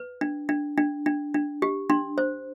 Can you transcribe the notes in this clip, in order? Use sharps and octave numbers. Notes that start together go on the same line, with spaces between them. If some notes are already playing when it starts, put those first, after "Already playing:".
Already playing: B4
D4
D4
D4
D4
D4
G4
D4 C6
C5